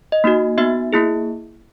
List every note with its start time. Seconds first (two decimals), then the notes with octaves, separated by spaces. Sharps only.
0.12 D#5
0.24 A#3 D#4 F#4
0.58 B3 D#4 F#4 E5
0.93 A#3 E4 G#4